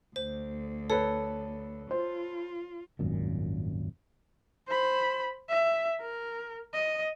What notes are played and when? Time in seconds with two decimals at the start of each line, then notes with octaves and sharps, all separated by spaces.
0.16 D2 C5
0.90 A4 B4 C#5
1.91 F4 C5
2.99 D#1 G#1 F#2 A#2
4.68 C5 B5
5.49 E5
6.01 A#4
6.74 D#5